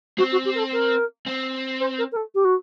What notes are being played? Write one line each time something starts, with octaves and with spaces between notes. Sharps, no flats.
C4 F#4
F#4
G4
A#4
A4
A#4
C4
C5
A#4
A#4
A4
G4
F#4